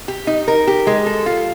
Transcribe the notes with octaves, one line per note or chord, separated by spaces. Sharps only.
G4
D#4
A#4
G4
G#3
A4
F4